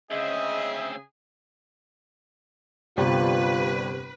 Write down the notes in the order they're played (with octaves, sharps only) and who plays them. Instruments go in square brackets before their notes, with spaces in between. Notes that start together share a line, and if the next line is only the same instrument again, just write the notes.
[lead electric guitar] D2 C4 [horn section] C#3 G#4 [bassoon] G#3 [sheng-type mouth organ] E5
[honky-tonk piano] G1 G4 D5 [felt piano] C3 [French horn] F4 [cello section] B4